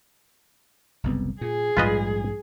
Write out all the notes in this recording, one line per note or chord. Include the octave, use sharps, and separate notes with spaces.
F#1 C2 B3
A#2 G#4
A#1 G#2 G3 F4 B4 D#5